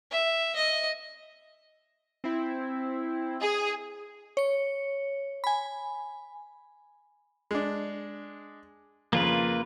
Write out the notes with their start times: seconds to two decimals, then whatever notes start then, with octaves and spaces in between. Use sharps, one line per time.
0.11 E5
0.55 D#5
2.24 C4 E4
3.40 G#4
4.37 C#5 C#7
5.44 G#5 B5
7.51 G#3 D4
9.13 F2 C#3 A#3 F4 B4